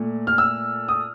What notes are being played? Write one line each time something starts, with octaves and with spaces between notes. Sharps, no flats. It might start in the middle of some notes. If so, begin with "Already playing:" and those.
Already playing: A#2 A3
F6
E6
D#6